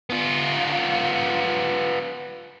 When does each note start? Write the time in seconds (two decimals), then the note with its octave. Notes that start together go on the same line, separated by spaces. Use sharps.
0.10 B3 F4